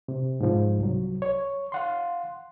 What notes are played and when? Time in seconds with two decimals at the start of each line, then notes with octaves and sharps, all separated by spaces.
0.08 C3
0.40 G#2 F3
0.79 C2 F#3
1.22 C#5
1.72 F5 F#5 C6